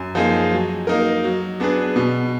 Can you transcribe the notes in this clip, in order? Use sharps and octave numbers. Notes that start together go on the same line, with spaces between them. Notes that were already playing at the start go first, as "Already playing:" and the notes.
Already playing: F#2
F3 A#3 D#4 G#4
F#3
A#3 D#4 A#4
F#3
B3 D4 G#4 B4
B2